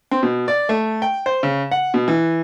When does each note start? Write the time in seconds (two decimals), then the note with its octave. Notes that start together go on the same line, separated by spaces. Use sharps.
0.11 C4
0.23 B2
0.48 D5
0.69 A3
1.02 G5
1.26 C5
1.43 C#3
1.71 F#5
1.94 B2
2.08 E3